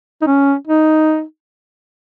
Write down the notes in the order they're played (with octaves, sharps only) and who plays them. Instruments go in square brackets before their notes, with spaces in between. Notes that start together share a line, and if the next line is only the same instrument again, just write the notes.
[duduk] D#4
C#4
D#4